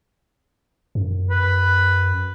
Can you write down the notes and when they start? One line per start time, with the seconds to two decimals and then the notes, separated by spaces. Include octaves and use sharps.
0.95 F#2
1.30 B4